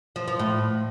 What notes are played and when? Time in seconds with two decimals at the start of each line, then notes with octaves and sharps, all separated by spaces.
0.16 F3
0.28 F3
0.39 A2